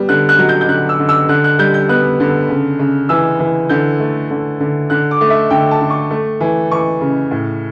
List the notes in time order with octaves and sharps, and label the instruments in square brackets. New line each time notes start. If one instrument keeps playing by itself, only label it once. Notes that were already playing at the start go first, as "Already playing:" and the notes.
Already playing: [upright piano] G3 B3
D3 F#6
F#6
F#3
G6
G6
D3 F#6
E6
D3
E6
D3 F#6
F#6
G3 G6
G6
B3 F#6
D3
C#3
C#3
E3 E6
E3
D3 G6
A3
D3
D3
D3 F#6
D6
A3
E5
D3 G5
A5
D3
C#6
A3
E3
E3 C#6
C#3
A2